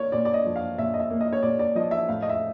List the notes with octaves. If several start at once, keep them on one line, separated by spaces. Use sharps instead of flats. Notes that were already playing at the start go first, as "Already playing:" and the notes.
Already playing: A#2 A#3 C#5 D5
A#2 D5
D5
D#5
F3
F5
A#2 E5
D#5
E5
A#3
D#5
C#5
A#2 D5
D5
F3 D#5
E5
A2 F5
D#5
E5